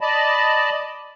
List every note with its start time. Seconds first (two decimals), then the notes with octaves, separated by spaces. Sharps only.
0.01 D5 D#5 A5 B5